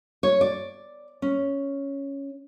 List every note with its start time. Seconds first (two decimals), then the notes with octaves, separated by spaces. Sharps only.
0.23 C#5
0.41 D5
1.22 C#4